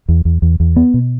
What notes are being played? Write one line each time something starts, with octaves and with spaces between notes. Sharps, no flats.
E2
E2
E2
E2
B3
B2